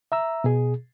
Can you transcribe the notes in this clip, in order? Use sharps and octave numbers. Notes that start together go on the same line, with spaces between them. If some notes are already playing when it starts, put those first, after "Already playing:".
E5 A#5 E6
B2 G#4